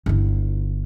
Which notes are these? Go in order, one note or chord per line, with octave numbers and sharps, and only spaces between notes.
G1 E4